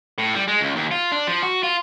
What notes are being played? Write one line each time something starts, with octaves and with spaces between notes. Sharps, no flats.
A2
G3
G#3
C#2
D#2
F4
D4
F3
F#4
F4